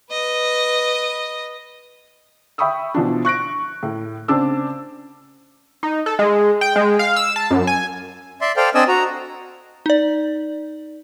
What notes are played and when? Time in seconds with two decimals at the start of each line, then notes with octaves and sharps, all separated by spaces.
0.11 B4 D#5
2.58 E5 G5 B5 C#6 D#6 E6
2.94 B2 E3 F3 D4
3.25 C#6 F#6 A#6 D7
3.83 A2
4.28 C#3 C4 D4 A5 D6 E6
5.83 D#4
6.06 A4
6.19 G#3
6.61 G5
6.76 G#3
6.99 F5
7.16 E6
7.36 A5
7.51 F#2
7.67 G#5
8.41 D5 E5 C6
8.56 A4 C5 D5 F5 G5
8.75 C4 D4 D5 D#5 G#5 E6
8.88 F#4 A#5
9.86 D#4 D5